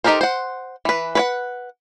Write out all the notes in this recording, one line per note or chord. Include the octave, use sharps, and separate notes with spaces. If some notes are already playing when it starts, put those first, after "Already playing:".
D#4 G4 A4 A#4 C5
C5 F#5
E3 B4
B4 C#5 F#5